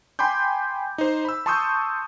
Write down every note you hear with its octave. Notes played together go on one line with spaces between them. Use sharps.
G5 G#5 B5 C6 D6 G6
D#4 C5
B5 E6
A5 C6 C#6 D#6 E6 G6